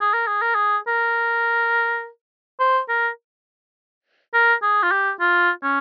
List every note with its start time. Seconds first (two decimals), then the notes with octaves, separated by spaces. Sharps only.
0.01 G#4
0.13 A#4
0.27 G#4
0.42 A#4
0.55 G#4
0.87 A#4
2.60 C5
2.89 A#4
4.34 A#4
4.62 G#4
4.83 F4
4.91 G4
5.20 F4
5.63 C#4